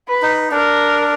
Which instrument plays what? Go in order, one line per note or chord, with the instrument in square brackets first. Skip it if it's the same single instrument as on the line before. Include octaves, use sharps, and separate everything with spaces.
[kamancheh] B4
[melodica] D#4
[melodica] D4 [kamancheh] A#4